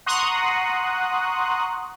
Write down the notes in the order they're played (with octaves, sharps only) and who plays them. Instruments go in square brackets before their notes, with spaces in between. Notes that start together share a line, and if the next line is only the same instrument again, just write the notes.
[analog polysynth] F#5 A#5 C6 C#6 D#6 F#6